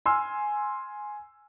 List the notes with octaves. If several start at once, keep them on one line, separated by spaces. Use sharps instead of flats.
G#5 C6 E6 F6